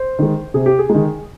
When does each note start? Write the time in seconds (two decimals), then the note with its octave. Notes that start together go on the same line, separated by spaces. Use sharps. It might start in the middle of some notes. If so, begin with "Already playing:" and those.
Already playing: C5
0.19 D#3 G#3
0.54 C3 G#4
0.66 G4
0.79 G#4
0.89 G#3
0.94 D#3